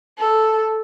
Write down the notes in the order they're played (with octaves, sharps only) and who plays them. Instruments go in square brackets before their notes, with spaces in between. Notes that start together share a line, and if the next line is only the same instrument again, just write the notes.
[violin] A4